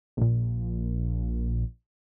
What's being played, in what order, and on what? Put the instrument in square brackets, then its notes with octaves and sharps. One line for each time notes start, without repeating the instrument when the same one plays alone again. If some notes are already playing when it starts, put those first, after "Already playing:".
[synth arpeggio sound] A#1 A#2